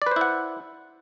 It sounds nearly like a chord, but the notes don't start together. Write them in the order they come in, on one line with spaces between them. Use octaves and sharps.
D5 B4 C5 E4 F#5